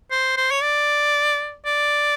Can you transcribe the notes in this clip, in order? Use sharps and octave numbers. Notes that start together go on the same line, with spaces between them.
C5
C5
C#5
D5
D5